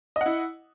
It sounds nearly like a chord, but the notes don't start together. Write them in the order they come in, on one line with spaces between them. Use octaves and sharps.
D#5 F#5 E4